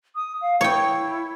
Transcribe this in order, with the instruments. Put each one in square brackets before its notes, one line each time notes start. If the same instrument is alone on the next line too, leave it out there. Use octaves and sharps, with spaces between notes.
[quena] D#6
F5
[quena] E4 [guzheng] C#5 G5